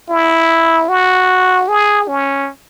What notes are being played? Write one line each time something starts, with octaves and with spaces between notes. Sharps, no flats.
E4
F#4
G#4
C#4